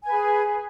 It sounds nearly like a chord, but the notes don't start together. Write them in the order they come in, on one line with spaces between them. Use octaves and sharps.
G#5 B4 G#4